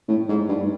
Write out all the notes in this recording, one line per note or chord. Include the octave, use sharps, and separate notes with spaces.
A2
G#2
G2